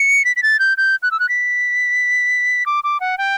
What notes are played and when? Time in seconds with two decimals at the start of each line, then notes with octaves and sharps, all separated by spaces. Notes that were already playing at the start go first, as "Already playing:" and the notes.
Already playing: C#7
0.25 B6
0.36 B6
0.43 A6
0.59 G6
0.77 G6
1.03 F#6
1.11 E6
1.20 F#6
1.29 B6
2.66 D6
2.84 D6
3.00 F#5
3.18 G5